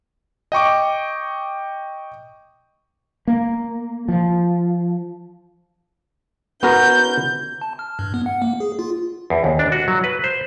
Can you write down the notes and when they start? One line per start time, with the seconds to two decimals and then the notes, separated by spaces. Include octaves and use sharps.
0.52 D#5 G5 C#6 D6
3.27 A#3
4.08 F3
6.63 B3 F#4 A#4 G6
7.61 A5
7.79 F6
7.99 G2
8.14 B3
8.26 F#5
8.42 A#3
8.60 G#4
8.79 F4
9.30 E2
9.44 D#2
9.59 D4
9.72 F#4
9.88 F#3
10.04 B4
10.24 C5